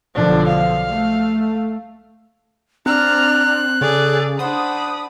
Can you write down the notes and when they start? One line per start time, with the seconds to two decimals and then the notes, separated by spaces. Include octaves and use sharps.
0.15 B1 D3 F3 D4
0.48 F5
0.90 A3
2.86 C4 D4 A#5 F6 F#6
3.81 C#3 G#4 A4 D5
4.39 D4 C5 F#5 B5 D#6